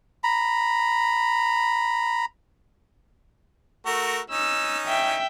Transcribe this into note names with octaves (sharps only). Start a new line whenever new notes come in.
A#5 B5
A3 F#4 A#4
C#4 D#4 E6
E5 G5